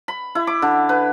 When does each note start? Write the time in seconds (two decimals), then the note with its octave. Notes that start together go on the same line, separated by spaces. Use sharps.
0.08 B5
0.35 E4
0.47 D6
0.62 D3
0.89 B4